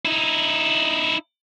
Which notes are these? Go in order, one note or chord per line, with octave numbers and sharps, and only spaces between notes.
D#4 E4